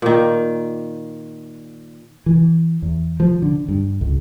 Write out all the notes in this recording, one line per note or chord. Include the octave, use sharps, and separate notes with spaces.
A#2 D#3
E3
E2
F3
D3
G2
C#2